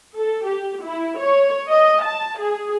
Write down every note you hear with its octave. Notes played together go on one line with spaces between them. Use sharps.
A4
G4
E4
C#5
D#5
A5
G#4